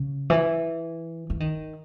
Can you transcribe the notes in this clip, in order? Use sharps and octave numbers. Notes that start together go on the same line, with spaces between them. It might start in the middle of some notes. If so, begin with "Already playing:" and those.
Already playing: C#3
E3
E3
D#3